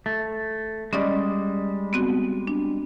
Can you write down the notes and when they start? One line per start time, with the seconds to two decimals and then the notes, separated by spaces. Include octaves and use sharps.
0.06 A3
0.93 G3 G#3 C#4 D5 D#5
1.93 B3 C4 F#4
2.47 D4